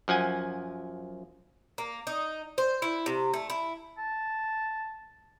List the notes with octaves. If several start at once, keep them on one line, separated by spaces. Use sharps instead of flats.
F#2 F3 F#5 G#5
A#3
D#4
C5
E4
C3
A3
E4
A5